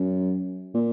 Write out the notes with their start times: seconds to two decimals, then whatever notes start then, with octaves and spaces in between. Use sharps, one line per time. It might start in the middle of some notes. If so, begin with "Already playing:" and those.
Already playing: F#2
0.74 A#2